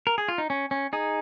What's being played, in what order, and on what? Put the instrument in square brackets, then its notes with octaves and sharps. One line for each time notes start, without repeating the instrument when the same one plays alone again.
[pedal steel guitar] A#4
G#4
F4
D#4
C#4
C#4
D#4 G#4